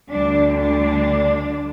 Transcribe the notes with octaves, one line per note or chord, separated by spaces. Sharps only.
D2 D3 G3 D4
D4